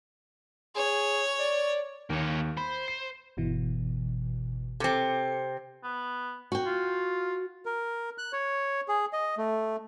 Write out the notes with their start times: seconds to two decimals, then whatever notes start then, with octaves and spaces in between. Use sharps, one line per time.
0.76 G#4 C#5
1.40 D5
2.10 D#2 A#3 C#5
2.57 C5 B5
2.88 C7
3.37 G1 B2 E3
4.80 C3 C4 A4 C#7
5.84 B3
6.52 F#4 G5
6.66 F4
7.66 A#4
8.18 F#6
8.33 C#5
8.88 G#4
9.13 D#5
9.38 A3